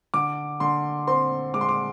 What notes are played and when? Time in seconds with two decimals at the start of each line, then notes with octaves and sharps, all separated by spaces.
0.14 D3 D6
0.60 D3 C6
1.07 C4 C6
1.54 G#3 D6
1.61 C6
1.69 D6